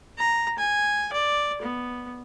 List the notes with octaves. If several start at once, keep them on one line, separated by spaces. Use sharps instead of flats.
A#5
G#5
D5
B3